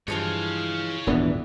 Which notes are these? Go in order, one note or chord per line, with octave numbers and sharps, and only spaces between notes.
G2 E3 F3 G#3 C#5 F5
D#1 G#2 E3 B3 D4